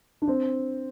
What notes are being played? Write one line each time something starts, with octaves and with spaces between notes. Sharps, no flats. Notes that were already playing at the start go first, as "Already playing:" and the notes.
D4
C4